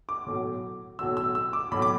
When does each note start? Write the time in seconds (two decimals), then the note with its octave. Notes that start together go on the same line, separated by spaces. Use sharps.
0.09 D6
0.26 B1 A2 F#3
0.99 B1 A2 F#3 E6
1.17 E6
1.35 E6
1.53 D6
1.71 B1 A2 F#3 B5
1.82 D6